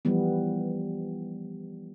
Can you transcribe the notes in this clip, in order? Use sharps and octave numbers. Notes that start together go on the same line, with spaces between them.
E3 F3 G3 B3